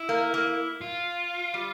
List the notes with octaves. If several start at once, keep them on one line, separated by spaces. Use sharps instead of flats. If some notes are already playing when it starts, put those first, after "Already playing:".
Already playing: E4
A#3
A#3
F4
G3